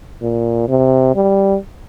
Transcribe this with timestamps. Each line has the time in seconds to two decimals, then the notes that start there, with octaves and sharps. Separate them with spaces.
0.22 A#2
0.68 C3
1.15 G3